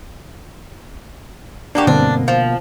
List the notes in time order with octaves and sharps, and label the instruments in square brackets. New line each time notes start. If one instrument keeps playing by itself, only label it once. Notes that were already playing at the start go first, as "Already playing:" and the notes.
[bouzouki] A#3 F#4 G4 [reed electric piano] D4
[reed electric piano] G2 C4 [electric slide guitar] B2 A#3 [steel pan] D3 [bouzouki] D4
[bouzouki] F3 [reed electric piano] F5